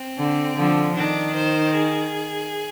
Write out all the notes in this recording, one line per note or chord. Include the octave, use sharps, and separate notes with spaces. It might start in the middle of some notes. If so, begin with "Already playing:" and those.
Already playing: C4
D3
D3 F3
D#3 D4
C5
G#4